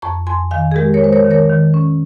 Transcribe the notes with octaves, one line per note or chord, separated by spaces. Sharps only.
F2 A#5 C#6
F2 G#5 C6
D#3 F5 G#5
G#4
G#3 G4 A#4
A#4 C#5
G#3 C5
A#4 C#5
D#3
A#4 C#5
D#3
C#4